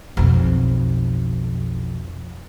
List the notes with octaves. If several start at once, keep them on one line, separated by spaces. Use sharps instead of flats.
B1 F2